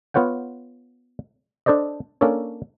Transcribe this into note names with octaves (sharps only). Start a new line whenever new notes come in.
B3 F4 C#5 F#5 G5
D4 A4 C5 D5 D#5
A#3 C#4 D4 A4 C#5